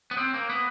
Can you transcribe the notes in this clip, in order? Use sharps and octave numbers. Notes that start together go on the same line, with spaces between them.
B3
C4
A#3
B3